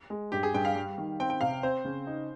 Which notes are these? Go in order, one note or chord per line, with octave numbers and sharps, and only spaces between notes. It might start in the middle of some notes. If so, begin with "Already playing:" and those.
G#3
G2 G4
G#4
G2 G5
F5
G3
D#3
C4 G5
G5
C3 F5
C4 C5
C#3
D#4